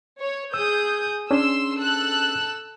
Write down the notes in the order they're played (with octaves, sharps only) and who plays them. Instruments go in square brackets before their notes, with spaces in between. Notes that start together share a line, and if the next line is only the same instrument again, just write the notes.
[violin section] C#5
[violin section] G#4 D#6 G6 [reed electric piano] E6
[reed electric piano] C#4 D4 G#4 [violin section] C6 E6
[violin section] A4 E6 F#6